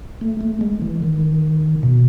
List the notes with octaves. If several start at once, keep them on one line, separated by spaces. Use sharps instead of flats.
A3
A3
G#3
E3
D#3
B2